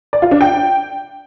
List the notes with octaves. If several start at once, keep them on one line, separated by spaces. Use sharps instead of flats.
D5
F4
D4
G5